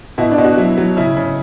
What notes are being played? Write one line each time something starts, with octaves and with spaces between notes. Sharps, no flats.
B2 E4
D4
B2
F#4
F#3 E4
F#3
C#3 E4
C#3